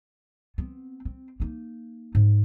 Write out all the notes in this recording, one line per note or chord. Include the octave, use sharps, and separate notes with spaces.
B3 C4
C4
A#3 D#4
G#2